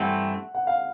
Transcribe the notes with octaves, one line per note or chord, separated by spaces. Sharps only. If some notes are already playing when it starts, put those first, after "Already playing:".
Already playing: G2 E3 A3 C4 F#5
F#5
F5